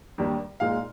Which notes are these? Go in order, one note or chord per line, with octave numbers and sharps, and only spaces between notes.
D#2 D#3 G3 D4
A#2 G#3 D#4 F5